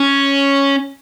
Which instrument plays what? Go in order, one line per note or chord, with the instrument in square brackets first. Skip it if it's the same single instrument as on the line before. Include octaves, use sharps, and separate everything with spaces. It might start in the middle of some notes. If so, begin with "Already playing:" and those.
Already playing: [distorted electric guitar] C#4